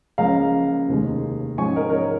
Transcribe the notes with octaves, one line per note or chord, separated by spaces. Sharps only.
C#2 C#3 F3 A#3 C#4 F5 A#5
F1 D#2 D#3 G#3
G#2 F3 G#3 C#4 G#5 C#6
A#4 D#5
A#4
C#5